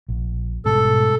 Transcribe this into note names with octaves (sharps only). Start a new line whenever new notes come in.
A#1
G#2 B2 G3 A4